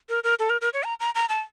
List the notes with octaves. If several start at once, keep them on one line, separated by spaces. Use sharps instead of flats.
A#4
A#4
A4
A#4
A#4
C#5
A#5
A#5
A#5
A5